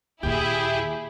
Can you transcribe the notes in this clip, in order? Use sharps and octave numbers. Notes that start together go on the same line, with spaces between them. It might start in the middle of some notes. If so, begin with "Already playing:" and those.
D#2 A#2 E4 G4 G#4